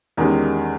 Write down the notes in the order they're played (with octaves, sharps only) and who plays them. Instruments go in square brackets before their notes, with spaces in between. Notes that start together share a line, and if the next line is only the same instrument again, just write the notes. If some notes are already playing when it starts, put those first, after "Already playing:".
[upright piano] E2 D#3 G#3 C#4 G4